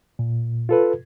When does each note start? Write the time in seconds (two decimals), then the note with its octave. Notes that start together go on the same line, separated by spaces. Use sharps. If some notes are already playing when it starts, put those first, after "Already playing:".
0.19 A#2
0.69 F4 A4 B4